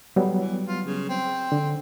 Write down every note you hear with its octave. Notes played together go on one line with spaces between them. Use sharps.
A2 F#3 G3 B3
E3
F4
C#3
C4
D3